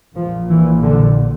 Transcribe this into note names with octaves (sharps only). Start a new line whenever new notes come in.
A#1 A#2 F3
E3
D3